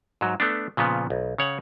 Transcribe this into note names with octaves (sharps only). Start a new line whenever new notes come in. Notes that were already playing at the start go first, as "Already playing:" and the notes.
G#2 F#3
A3 B3 D4
A#2 C#3 F3 B3
B1
C#3 C#5 F#5